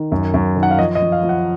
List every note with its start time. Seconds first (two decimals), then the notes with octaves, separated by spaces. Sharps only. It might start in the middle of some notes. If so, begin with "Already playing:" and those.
Already playing: D#3
0.12 F#2
0.34 F#2
0.56 D#3
0.63 F#5
0.71 F5
0.79 F3 D#5
0.95 D#5
1.01 F3
1.12 F5
1.23 F3
1.29 F#5